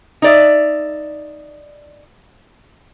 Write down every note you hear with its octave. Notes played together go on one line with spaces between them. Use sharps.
D#4 D5 E5